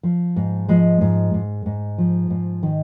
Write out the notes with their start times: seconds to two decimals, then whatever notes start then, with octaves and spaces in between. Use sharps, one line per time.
0.03 F3
0.36 G#2
0.68 F3 G#3
1.01 G#2
1.34 G#2
1.66 G#2
1.98 F3
2.30 G#2
2.63 D#3